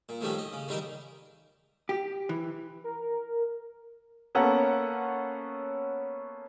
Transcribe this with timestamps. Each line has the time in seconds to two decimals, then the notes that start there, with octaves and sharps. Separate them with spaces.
0.09 A#2
0.21 A2 D#3 F3 G3 A3 C#4
0.38 D#5
0.53 C#3
0.68 D#3 E3 G3 D#4 A#4 A#5
1.89 G4
2.29 E3
2.84 A#4
4.35 A#3 B3 C#4 A4 F#5